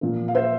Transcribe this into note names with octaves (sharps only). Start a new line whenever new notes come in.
A#2 F3
F5
C5 E5